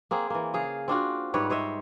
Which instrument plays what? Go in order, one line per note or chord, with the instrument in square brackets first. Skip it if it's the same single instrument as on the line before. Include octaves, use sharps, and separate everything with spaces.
[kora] A#3 C4 G#4
E3 A#3
C#3 G#4 F5
C4 D4 F4 F#4
G#2 G3 B4 C#5
C5 C#5 D#5 E5